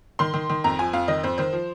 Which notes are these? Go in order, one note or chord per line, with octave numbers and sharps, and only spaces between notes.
D#3 C6
D#3
D#3
F2 A#5
F3 G#5
F2 F5
D#3 D#5
F2 C5
D#3 C5
F3